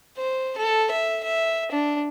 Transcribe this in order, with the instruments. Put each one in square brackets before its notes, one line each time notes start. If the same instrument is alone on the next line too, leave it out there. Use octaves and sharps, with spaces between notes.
[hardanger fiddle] C5
A4
E5
E5
D4